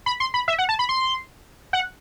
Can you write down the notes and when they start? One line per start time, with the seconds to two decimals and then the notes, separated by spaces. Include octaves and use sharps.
0.06 B5
0.20 C6
0.34 B5
0.48 E5
0.58 F#5
0.69 A5
0.79 B5
0.89 C6
1.73 F#5